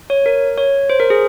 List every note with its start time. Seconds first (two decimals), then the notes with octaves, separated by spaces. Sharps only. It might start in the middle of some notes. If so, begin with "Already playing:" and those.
0.10 C#5
0.26 A#4
0.58 C#5
0.90 C5
1.00 A#4
1.10 G#4